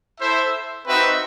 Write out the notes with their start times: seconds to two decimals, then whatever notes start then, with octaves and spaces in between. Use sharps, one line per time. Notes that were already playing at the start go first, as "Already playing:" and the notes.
0.19 E4 A4 C5 E5
0.86 C4 D#4 F#4 B4 E5